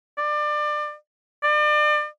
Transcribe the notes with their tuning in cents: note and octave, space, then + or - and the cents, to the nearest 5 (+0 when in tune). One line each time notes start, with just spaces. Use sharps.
D5 +25
D5 +35